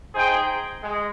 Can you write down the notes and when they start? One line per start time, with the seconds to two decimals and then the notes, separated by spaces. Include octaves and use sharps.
0.15 D#4 G#4 C5 G5
0.82 G#3